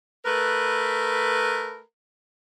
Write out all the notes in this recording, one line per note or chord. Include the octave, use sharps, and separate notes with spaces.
A3 A#4 B4